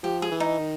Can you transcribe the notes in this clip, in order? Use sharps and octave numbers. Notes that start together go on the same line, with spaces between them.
F3 G4
G#4
E3
D#4
D#3